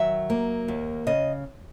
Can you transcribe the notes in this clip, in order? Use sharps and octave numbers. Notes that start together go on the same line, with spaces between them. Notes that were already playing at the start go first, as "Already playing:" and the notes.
Already playing: D#3 F#3 E5
A#3
D#2
C#3 D#5